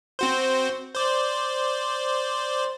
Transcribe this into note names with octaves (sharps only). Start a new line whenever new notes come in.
C4 F#4 C5
C5 D5